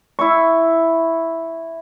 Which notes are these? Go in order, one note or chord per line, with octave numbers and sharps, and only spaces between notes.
E4 C#6